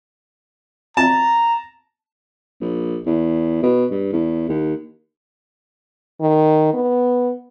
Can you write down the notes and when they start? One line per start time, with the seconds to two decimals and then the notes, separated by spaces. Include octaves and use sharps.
0.97 A5 A#5
2.61 A#1
3.06 E2
3.63 B2
3.91 G2
4.12 E2
4.49 D#2
6.21 D#3
6.74 B3